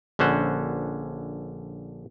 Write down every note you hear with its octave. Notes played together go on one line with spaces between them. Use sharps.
A#1 D3 C#4 C5 F#5